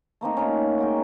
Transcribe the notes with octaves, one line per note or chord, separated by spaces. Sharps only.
A3 A#3 C4 D#4
C#4 D#4 F4
G#3 F#4 G5